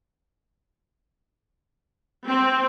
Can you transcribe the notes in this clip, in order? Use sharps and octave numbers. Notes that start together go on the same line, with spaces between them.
C4